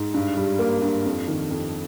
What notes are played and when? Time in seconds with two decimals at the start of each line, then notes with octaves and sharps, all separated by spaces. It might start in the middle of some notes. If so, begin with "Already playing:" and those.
Already playing: G#2
0.14 G2
0.37 G3
0.59 A#3
0.82 G2
1.05 F2
1.28 D#3
1.50 F2